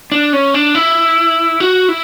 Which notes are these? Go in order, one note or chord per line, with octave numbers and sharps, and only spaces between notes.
D4
C#4
D4
E4
F#4
E4